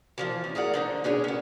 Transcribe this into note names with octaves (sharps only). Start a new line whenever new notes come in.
E3 F3 C4
C#4
G#4 A#4 D5 F#5
D3 D#4 C5
C#4 D4 G#4 C#5
B3 C#4